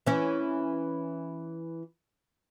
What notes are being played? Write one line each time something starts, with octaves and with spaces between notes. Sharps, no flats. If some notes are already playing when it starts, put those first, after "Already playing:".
E3 C#4